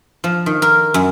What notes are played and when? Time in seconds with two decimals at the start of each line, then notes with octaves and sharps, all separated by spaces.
0.24 F3
0.46 D#3
0.62 A#4
0.94 F#2